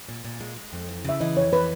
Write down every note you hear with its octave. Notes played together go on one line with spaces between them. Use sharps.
A#2
A#2
G#3
G#3
F2
E3
C#3 E5
E3 D#5
F2 C#5
E3 B4